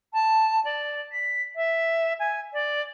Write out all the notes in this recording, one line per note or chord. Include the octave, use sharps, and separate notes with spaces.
A5
D5
B6
E5
G#5
D5